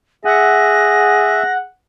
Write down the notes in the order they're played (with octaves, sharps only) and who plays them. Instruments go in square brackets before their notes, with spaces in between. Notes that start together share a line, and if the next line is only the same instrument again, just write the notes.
[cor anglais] G#4 [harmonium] E5 [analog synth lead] F#5 [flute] A#6